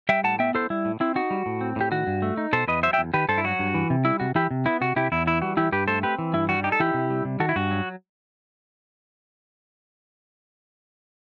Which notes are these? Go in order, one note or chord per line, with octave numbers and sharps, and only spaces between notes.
G3 E5 G5
A2 F#5 A5
B3 E5 G5
E4 A4 C5
G3 E4
A2
C4 E4
D#4 F#4
G3
A2
C4
A2 G4
D#3 F#4
G2
A3
D#4
B2 A4 C5
E2 B4 D#5
F#3 C5 E5
E5 G5
E2
D#3 G4 B4
G2 A4 C5
E4
F#3 F#4
G2
E3
C3
G3 E4
C3 F#4
E3 E4 G4
C3
B3 E4
C3 F#4
C3 E4 G4
E2 E4
E3 E4
G3 F#4
E3 E4 G4
G2 G4 B4
A3 A4 C5
C4 G4 B4
E3
G2 E4
G3 F#4
D#4 G4
A4
E3 E4 G4
C3
G3
C3
D#3 F#4 A4
E4
G2 F#4
F#3